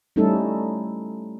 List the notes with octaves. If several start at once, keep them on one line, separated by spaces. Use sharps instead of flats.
G3 A3 C#4 D#4 E4 A4